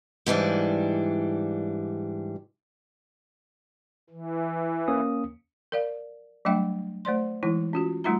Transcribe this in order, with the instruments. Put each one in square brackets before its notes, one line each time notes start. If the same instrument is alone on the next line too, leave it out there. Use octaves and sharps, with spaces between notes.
[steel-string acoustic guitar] G#2 E3 G3 D4
[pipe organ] E3
[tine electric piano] A#3 C#4 D#6
[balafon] A#4 D5 F5
F#3 G3 A3 D4 E5 G5
A3 C5 D5 C6
E3 G#3 D#4 E4
C#4 F4 F#4
G3 A3 D#4 F4 E5 A#5